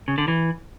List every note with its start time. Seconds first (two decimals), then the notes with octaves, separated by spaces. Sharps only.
0.08 C#3
0.18 D3
0.28 E3